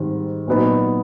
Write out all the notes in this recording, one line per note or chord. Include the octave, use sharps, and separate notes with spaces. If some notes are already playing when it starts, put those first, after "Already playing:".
Already playing: G#2 D#3 G3 C4
A#2 F#3 B3 D#4